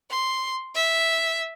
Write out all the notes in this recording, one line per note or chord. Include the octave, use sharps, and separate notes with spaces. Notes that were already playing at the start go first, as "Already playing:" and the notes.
C6
E5